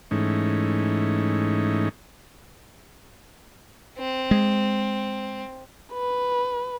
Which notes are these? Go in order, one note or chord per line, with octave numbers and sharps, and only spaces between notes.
G#2 E3 A3 C#4 D#4
C4
G#3
B4